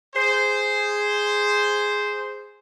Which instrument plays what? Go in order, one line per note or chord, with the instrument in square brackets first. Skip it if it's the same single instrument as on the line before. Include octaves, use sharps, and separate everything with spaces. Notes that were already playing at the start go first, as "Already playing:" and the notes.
[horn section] G#4 C5